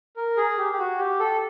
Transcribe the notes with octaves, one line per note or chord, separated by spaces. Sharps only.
A#4
G#4
G4
G4
F#4
G4
A4